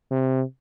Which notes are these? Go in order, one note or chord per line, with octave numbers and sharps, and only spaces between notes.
C3